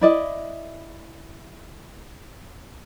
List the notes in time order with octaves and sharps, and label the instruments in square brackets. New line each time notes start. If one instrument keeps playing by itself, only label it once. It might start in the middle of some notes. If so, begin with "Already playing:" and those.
[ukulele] E4 D5 D#5